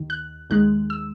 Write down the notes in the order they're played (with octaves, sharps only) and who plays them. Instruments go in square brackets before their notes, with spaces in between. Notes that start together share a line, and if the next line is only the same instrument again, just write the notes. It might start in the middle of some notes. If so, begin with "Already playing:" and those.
Already playing: [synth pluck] D#2 D#3
F#6
D#2 D#3 G#3 F#6
E6